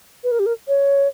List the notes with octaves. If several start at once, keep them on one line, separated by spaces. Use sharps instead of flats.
B4
A#4
G4
A#4
C#5